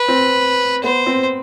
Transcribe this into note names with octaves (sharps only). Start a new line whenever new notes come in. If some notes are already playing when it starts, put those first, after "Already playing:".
Already playing: B4
C4
B3 C5
C4